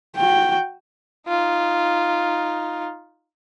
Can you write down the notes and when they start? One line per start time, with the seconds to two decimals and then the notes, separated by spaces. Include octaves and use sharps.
0.17 F#4 G5
1.28 D#4 F4